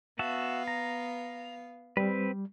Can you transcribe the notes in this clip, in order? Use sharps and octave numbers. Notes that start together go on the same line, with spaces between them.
B3 F#4 E5 F5 A5
A#5
G3 C4 B4